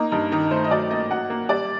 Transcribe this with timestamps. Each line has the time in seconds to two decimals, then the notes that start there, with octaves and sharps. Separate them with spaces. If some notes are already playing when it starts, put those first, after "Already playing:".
Already playing: A#3 D#4
0.11 G2 D#4
0.32 D#3 D#4
0.51 A3 C5
0.64 D#5
0.71 F#3 D5
0.90 A#3 D#5
1.10 F#3 F#5
1.30 A#3
1.49 G3 D5